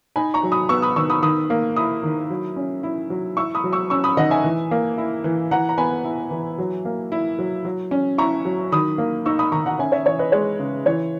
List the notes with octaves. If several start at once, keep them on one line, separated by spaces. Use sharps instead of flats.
D#4 G#5 B5
A#5 C#6
F#3
B5 D#6
B3 C#6 E6
B5 D#6
D#3 C#6 E6
B5 D#6
D#3 B5 D#6
A#3
E4 B5 D#6
D#3
F#3
C#4
E4
F#3
E4 C#6 E6
B5 D#6
F#3
C#6 E6
C#4 C#6 E6
B5 D#6
D#3 D#5 F#5
E5 G#5
E3
A#3
E4
E3
E3 F#5 A#5
A#5
B3 G#5 B5
E4
E3
F#3
A#3
E4
F#3
F#3
C#4
E4 A#5 C#6
F#3
D#3 B5 D#6
A#3
D#4 C#6 E6
B5 D#6
D#3 A#5 C#6
F#5 A#5
C#4 E5 G#5
C#5 E5
E3 C#5
B4 D#5
G#3 C#5
C#3
E3 C#5